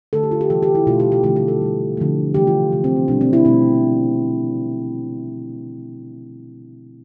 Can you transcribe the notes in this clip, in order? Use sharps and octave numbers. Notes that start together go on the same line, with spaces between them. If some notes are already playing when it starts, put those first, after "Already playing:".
D3 A3 A4
G4
F4
G4
C3 E3 G3 A4
G4
E4
B2 A3 F4
G4
G4
D3 F3 A3 G4
G4
A4
B2 G3
D3 F3 A3
C3 E3 A3 G4
F4
C3 F3 A3
C4
D4
B2 G3 D4
C4
E4
B2 A3 C4